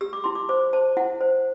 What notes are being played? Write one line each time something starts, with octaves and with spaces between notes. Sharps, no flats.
G4 E6
D6
E4 C6
D6
C5 D6
C5 A5
E4 F#5
C5